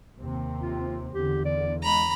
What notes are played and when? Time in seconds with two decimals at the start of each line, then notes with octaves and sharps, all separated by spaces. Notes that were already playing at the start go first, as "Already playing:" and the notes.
0.18 D#2 C3 C4
0.62 F4
1.15 E2 D3 G4
1.45 D5
1.83 G#3 A#5 B5